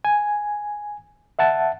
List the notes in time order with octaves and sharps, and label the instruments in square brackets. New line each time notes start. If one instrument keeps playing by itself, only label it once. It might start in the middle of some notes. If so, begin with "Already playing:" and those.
[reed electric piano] G#5
E5 F#5 A5